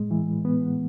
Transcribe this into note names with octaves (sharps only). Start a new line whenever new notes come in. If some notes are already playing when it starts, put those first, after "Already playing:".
Already playing: A2 G#3
E3
B3